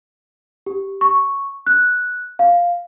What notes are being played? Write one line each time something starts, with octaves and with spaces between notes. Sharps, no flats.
G4
C#6
F#6
F5